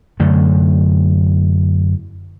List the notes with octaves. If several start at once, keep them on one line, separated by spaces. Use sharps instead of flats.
F#2 D3 A3